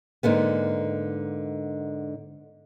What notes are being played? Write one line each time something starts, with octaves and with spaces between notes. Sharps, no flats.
G#2 D3 A#3 B3